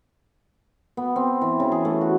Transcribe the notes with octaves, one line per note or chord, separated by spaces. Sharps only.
B3
C4
E3
C#3
G#4
A3
F#4